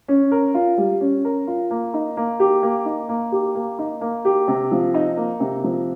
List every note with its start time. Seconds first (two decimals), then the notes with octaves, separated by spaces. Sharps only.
0.08 C#4
0.32 A#4
0.54 F4
0.77 G3
1.01 C#4
1.25 A#4
1.47 F4
1.71 A#3
1.94 D#4
2.17 A#3
2.40 G4
2.63 A#3
2.85 D#4
3.09 A#3
3.32 G4
3.55 A#3
3.79 D#4
4.01 A#3
4.25 G4
4.48 C3
4.71 F3
4.94 D#4
5.17 A#3
5.40 C3
5.64 F3